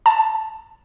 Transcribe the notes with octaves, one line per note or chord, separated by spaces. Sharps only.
A5